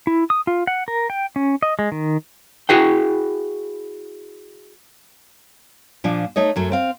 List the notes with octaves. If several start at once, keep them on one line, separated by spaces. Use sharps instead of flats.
E4
D#6
F4
F#5
A#4
G5
C#4
D#5
G#3
D#3
E4 F#4 G#4 G5
A#2 F3 D4
A3 D#4 C#5 D#5
F#2 F#3 A3
C4 F5